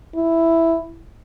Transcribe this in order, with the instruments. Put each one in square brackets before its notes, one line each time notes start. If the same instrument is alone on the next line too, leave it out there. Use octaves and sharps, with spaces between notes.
[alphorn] E4